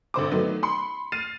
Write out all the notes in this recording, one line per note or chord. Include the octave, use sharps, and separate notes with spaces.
G#1 D3 C5 D6
D#3 F#3 A3 B3
B5 C6 C#7
F6 A6 C7 D#7 E7